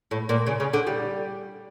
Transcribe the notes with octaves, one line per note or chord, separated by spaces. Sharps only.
A2
A#2
C#3
C#3
D3
G3